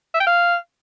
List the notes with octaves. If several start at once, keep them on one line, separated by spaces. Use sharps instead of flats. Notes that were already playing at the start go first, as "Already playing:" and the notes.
E5
G5
F5